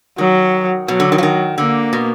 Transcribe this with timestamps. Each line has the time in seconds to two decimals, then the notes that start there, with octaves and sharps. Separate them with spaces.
0.18 D#3 F#3
0.88 B2 F#3
1.00 D3
1.12 D#3
1.18 F3
1.23 D#3
1.58 D3 A#3
1.93 B2